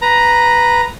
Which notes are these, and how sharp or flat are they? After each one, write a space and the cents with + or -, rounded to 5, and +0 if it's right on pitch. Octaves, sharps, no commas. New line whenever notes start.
B4 +0 A#5 +5